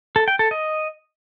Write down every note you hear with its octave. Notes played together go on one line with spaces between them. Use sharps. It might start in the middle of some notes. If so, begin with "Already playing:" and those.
A4
G5
A4
D#5